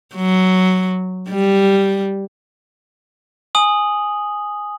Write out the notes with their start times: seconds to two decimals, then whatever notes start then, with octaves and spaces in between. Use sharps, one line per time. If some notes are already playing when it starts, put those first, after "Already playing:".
0.15 F#3
1.30 G3
3.55 G#5 D#6 F#7